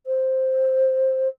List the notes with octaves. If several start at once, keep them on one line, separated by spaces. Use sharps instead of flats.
C5